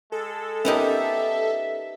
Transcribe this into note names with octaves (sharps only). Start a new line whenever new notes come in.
G#3 A4
B3 C#4 D#4 G4 A#4 D#5 E5